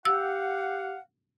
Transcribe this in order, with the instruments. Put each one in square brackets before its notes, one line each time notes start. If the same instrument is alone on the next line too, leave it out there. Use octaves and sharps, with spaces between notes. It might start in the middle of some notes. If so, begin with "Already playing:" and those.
[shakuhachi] G4 [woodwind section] F5 F#5 [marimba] E6